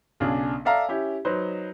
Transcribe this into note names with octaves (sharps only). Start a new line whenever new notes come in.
B1 C#3 D4 G#4
A4 D5 E5 F5 A#5
C#4 E4 G4
F#3 D#4 B4 C5